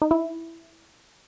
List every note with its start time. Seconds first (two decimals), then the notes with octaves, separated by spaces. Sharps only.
0.02 D#4
0.11 E4